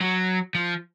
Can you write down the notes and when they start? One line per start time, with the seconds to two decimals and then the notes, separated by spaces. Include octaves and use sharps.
0.01 F#3
0.55 F3